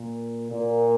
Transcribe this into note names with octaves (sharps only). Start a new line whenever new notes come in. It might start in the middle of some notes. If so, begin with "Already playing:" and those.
Already playing: A#2
A#2